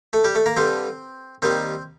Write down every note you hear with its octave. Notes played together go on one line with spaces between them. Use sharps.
A3 A4
G3 G4
A3 A4
A#3 A#4
G2 D3 G3 C4 C5
D#2 D#3 G3 C4 C5